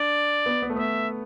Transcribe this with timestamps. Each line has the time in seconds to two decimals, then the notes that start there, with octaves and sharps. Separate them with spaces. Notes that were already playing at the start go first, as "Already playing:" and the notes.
Already playing: D4 D5
0.46 B3
0.62 B3
0.70 A3
0.76 B3 E5